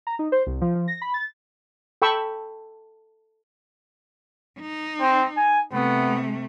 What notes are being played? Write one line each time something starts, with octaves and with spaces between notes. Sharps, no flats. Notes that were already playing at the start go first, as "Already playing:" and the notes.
A#5
D#4
C5
C2
F3
F3
A#6
B5
A6
A4 G5 B5 C#6 E6
D#4
C4
G#5
C3 A3 B3